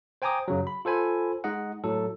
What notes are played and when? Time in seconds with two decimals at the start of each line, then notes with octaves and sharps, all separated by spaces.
0.22 C5 G5 G#5 A#5 D6 D#6
0.48 F#2 C#3 F#3
0.67 B5
0.85 F4 A4 C5 G#5 B5
1.44 G#3 D#4 D#5 F#5
1.84 A2 F#3 A4